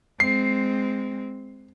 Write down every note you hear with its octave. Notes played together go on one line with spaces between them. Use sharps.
G#3 C4 C7